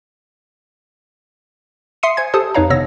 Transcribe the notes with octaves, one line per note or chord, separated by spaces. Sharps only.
E5 C6 D#6 C7 C#7 D#7
C5 G#5 G#6
G4 A4 C5 A5 D#6
F2 D#4 B4 C#5 F5 A#5
G#1 C3 B3 C#5 E6 A#6